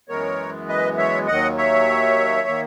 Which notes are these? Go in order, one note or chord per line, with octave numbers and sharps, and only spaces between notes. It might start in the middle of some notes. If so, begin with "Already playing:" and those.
F#2 E3 G#3 B3 A#4 C#5
B4 D#5
C#5 E5
D#2 D#3 F#3 D#5 F#5
C#5 E5
D#3 A#3